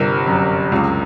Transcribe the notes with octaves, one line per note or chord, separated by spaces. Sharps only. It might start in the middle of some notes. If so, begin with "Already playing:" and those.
Already playing: G1 C3 A#4
F#2
C#2